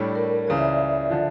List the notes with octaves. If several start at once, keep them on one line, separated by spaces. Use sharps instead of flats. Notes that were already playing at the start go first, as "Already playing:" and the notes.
Already playing: A2 G3 D4 A4 C#5
A#4
C#2 C#3 E3 D5
E5
D5
D3 F3